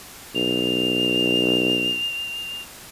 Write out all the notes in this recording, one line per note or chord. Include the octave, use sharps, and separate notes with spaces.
B1 F7